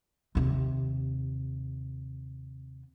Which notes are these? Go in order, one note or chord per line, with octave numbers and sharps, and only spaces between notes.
D#2 C3